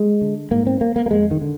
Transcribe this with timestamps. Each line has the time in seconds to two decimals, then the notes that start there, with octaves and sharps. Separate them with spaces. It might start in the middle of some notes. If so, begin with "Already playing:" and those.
Already playing: G#3
0.21 D3
0.51 G#2 A#3
0.67 C4
0.81 A#3
0.96 A#3
1.06 A#3
1.11 F2 G#3
1.31 D#3
1.41 D3